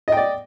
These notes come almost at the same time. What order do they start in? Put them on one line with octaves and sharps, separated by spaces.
D#5 G5 D5